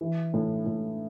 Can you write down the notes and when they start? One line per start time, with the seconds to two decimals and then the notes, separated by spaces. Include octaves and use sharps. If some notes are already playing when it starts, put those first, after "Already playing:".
0.01 E3
0.34 A2
0.66 A2